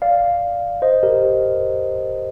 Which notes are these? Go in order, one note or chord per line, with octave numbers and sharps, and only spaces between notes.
D5 F5
C5 D#5
G4 A#4